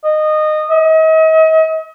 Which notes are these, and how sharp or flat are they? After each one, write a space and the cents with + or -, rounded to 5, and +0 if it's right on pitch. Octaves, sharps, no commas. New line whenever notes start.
D#5 -20
D#5 +40